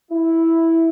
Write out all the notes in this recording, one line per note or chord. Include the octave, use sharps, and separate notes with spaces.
E4